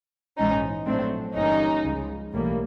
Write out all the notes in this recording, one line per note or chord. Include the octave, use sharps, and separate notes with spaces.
A#1 G#2 E3 C#4 D#4
A#1 A2 F#3 A3 C4 D4
G1 G2 E3 G3 A#3 C#4 D#4
C#2 C#3 F3 G#3
B1 A2 E3 G3 A#3